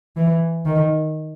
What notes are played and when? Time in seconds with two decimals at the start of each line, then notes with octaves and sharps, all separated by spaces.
0.16 E3
0.65 D#3